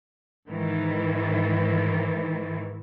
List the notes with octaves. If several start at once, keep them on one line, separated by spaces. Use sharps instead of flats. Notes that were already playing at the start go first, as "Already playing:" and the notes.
G#2 D#3 E3